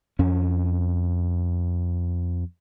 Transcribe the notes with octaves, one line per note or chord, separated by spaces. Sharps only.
F2 C#4